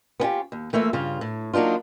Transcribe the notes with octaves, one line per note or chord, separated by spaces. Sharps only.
B3 C#4 F4 G4
D#2
E3 A3 A#3 F4 E5
G2 C#3 F4
A2
F#3 A#3 D4 D#4 F4